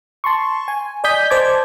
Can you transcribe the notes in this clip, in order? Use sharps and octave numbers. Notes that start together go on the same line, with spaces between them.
A5 C6 C#6
G#5
D5 D#5 G#5 D#6 G6 B6
C5 A5 D6 G#6